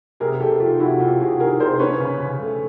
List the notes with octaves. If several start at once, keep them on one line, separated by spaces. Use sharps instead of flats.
C3 G#4 A#4
C3 G4 A4
D#3 F4 G4
C3 E4 F#4
C3 F4 G4
C3 F#4 G#4
D#3 G#4 A#4
C3 A#4 C5
C#4 B4 C#5
C#3
C#3
A3